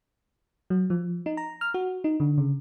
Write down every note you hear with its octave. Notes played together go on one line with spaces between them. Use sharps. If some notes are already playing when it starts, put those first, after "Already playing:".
F#3
F3
D#4
A#5
F6
F#4
D#4
D3
C#3